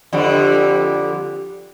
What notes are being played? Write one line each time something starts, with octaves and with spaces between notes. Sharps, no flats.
F2 D3 G3